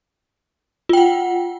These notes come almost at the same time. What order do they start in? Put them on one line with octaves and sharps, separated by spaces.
F4 G5 F#5